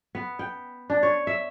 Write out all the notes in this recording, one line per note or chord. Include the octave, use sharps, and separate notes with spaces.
B3
G5
D4
C#5
E5